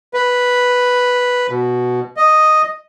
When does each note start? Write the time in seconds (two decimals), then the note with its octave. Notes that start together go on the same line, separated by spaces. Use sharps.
0.14 B4
1.49 B2
2.17 D#5